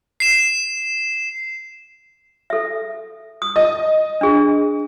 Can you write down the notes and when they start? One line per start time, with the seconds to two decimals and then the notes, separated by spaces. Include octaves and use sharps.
0.20 C7 E7
2.50 A4 E5
3.42 D#6
3.56 D#5
4.21 D4 G#4